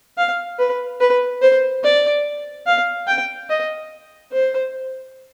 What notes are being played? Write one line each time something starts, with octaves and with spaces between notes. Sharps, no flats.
F5
B4
B4
C5
D5
F5
G5
D#5
C5